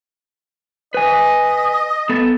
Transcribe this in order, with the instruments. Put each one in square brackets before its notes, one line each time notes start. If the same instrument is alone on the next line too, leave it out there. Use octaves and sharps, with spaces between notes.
[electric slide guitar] B4 G#5 [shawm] D#5
[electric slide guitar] B3 A4